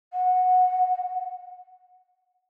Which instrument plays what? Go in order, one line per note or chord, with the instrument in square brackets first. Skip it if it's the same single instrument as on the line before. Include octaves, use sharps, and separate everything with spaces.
[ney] F#5